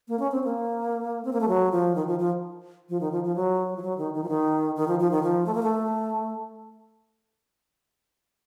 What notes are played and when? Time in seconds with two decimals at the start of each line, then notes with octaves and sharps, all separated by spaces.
0.08 A#3
0.19 C#4
0.32 C4
0.44 A#3
1.25 C4
1.33 A#3
1.41 A3
1.48 F#3
1.72 F3
1.95 D#3
2.07 F3
2.19 F3
2.89 F3
3.01 D#3
3.12 F3
3.24 F3
3.36 F#3
3.77 F3
3.82 F#3
3.98 D#3
4.14 D#3
4.24 F3
4.29 D#3
4.76 D#3
4.88 F3
4.99 F3
5.11 D#3
5.23 F3
5.46 A3
5.54 A#3
5.62 A3